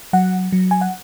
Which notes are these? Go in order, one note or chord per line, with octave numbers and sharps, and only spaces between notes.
F#3 F#5
F#3
G#5
F#5